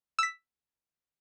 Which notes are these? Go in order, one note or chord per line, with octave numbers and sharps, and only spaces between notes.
E6 B6